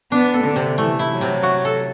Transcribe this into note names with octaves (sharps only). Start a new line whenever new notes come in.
B3 D4
A4
D3
C3
E3 A3
E4
F#3
C3
F#4
A4